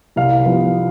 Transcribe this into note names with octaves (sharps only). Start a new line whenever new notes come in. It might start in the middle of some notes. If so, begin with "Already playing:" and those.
C2 F5
C3 F3 B3